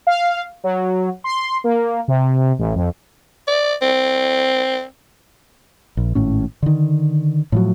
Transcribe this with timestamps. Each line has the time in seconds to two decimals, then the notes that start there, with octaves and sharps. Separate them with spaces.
0.07 F5
0.64 F#3
1.24 C6
1.64 A#3
2.08 C3
2.59 A1
2.76 F2
3.48 D5
3.82 C4
5.97 A#1
6.15 G#1 A2 C#4
6.63 D3 D#3
7.52 A2 F3 F#3